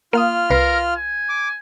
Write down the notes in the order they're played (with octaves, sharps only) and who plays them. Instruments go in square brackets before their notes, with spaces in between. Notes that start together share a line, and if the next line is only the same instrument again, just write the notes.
[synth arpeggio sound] A#3 F5 D#6 [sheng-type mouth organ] F4 F6
[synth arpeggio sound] C2 B4 C7 [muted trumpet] A#4
[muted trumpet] G#5
[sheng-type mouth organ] D6